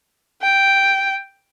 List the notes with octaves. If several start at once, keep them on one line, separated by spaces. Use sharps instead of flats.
G5